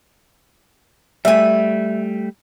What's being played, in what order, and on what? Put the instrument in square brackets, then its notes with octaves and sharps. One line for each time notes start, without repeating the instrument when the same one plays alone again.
[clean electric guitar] G3 A3 [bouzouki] E5 G#5